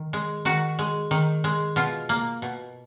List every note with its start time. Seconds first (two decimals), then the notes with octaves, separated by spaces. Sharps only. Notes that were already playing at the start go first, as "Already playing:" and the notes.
Already playing: D#3
0.13 G#3
0.45 D#3 F#4
0.79 G#3
1.11 D#3
1.44 G#3
1.76 B2 F4
2.09 A#3
2.42 B2